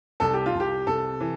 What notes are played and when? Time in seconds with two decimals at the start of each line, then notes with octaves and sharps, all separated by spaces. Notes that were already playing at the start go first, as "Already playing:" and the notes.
0.20 C2 A4
0.33 G4
0.46 F4
0.54 C2
0.60 G4
0.87 C3 A4
1.20 E3